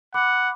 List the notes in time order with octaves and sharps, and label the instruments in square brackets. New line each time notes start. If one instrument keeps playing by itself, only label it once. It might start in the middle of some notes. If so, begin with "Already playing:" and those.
[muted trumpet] F#5 [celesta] B5 D6